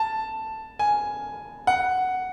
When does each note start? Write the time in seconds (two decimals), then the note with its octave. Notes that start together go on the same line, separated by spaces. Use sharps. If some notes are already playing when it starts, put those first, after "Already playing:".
Already playing: A5
0.79 G#5
1.67 F#5